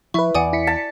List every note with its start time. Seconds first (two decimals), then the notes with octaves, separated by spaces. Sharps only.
0.14 F3 E4 B4 E5 C#6
0.35 E2 E3 D5 F#5 G#5 D#6
0.53 E4 B6 C#7
0.67 A5